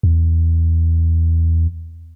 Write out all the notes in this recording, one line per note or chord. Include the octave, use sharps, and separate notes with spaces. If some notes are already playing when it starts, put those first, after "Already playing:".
E2